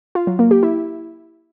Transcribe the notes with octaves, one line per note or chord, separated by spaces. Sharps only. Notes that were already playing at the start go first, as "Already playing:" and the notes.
F4
F#3
A#3
G4
E4